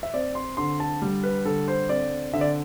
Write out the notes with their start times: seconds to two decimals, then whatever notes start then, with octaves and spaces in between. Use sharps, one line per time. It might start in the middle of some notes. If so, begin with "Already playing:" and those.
0.03 E5
0.14 C4 D5
0.35 C6
0.57 D3 C6
0.80 A5
1.02 G3
1.23 B4
1.45 D3 A4
1.68 C5
1.89 C4 D5
2.33 D3 E5
2.41 D5